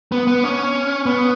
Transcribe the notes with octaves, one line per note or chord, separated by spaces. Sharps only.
B3
B3
C#4
B3